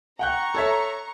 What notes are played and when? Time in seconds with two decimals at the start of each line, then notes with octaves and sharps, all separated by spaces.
0.19 F#5 G5 A#5 C#6 F#6
0.54 A4 C#5 E5